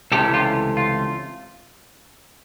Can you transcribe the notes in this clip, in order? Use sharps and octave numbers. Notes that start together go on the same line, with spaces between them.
C#2 C3 E3 A3 C#4 G4 A4
F4 G4
F4